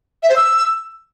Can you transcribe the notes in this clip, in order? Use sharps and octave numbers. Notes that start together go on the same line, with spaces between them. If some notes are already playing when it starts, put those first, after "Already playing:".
E5
C5
E6